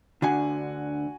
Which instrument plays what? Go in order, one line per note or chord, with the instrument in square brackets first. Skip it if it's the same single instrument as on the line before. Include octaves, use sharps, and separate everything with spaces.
[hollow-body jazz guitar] D2 D3 [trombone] D4 [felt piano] F#4 F#5 G#5